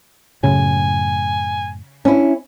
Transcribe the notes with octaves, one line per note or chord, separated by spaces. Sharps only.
F#2 A2 C#3 G#5
C#4 D4 E4